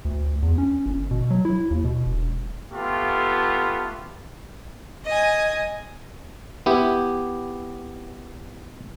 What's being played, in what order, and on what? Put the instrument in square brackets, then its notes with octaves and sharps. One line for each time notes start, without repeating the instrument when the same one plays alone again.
[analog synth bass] D2
E2
C#4
G1
B2
F#3
E4
D#2
B2
E1
[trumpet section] A3 B3 F4 G4
[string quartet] D#5 G#5
[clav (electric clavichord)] B3 E4 G4